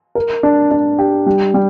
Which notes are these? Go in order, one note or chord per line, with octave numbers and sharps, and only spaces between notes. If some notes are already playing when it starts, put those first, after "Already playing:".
A#4
D4
D4
G4
G3
G3